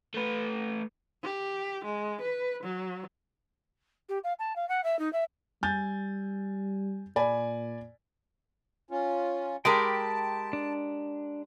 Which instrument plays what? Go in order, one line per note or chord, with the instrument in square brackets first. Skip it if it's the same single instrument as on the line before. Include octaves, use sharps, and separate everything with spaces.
[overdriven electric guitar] A3 B4
[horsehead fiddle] G4
G#3
B4
F#3
[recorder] G4
F5
A5
F5
F#5
E5
D#4
E5
[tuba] G3 [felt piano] G#5 G6 A6
[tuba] A#2 [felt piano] D5 G#5 B5
[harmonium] C#4 F4
[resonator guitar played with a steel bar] G#3 G4 A#4 [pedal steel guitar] G5 B5 [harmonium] A5
[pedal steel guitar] D4